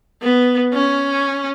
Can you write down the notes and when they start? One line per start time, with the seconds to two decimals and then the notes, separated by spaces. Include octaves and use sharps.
0.22 B3
0.74 C#4